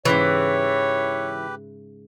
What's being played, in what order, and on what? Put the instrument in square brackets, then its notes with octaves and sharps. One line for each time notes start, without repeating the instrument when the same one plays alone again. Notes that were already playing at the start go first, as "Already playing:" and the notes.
[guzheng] G#2 C#3 G5 [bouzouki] E3 [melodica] G4 B4 [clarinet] C#5